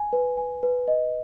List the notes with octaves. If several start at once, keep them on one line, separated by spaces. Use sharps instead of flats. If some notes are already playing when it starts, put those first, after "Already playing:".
Already playing: G#5
B4
G#5
B4
D#5